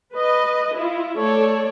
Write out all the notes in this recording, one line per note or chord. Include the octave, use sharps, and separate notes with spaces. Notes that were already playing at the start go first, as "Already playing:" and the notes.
B4 D#5
E4 F4
A3 A4 C#5 D5